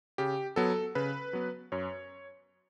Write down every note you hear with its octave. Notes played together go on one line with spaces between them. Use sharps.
C#3 G4
F#3 B3 A4
C#3 B4
F#3 B3
F#2 C#5